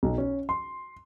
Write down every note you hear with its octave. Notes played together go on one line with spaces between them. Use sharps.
B1
C#4
C6